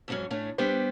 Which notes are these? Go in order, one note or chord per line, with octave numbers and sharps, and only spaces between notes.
F2 G#2 E3 F#3 C#4
A2 A3 C#4 D4
G3 B3 D4 G4 B4 C5